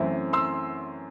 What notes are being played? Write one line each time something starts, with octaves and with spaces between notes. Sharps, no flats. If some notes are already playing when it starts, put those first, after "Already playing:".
Already playing: F#2 E3 A3 C4 E4
C6 E6